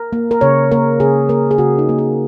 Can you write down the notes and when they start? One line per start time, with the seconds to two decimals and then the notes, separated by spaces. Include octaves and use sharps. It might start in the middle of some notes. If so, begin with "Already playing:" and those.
Already playing: A#4
0.13 A#3
0.31 A#4
0.41 C#3 C#5
0.72 A#3 A#4
1.00 C#3 G#4
1.29 A#3 A#4
1.51 G#4
1.58 C#3 F#4
1.79 D#4
1.89 A#3
1.98 G#4